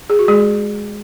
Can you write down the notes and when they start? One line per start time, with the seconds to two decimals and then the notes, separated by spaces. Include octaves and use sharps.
0.10 G#4
0.19 F#4
0.28 G#3 G#4